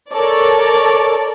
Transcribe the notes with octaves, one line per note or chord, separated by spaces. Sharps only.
A4 A#4 C#5 D5